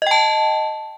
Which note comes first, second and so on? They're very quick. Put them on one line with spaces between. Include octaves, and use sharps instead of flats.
D#5 G5 A5